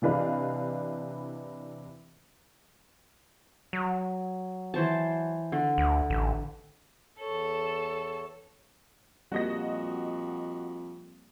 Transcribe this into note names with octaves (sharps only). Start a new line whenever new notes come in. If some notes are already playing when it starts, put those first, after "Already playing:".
C3 E3 D4 B4 D#5 F5
F#3
E3 C5 A5
D3
D2
A1
E2 A4 C#5
F2 G3 A#3 F#4 D#5 A#6